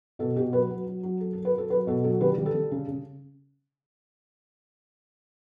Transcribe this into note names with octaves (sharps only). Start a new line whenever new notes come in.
B2 A4
B2 G4
F#3 B4
F#3
F#3
F#3
F#3 A4
A4
F#3
B4
F#3 A4
F#3 B4
B2 A4
F#3 A4
G3 B4
G3
A4
G3
C#3
C#3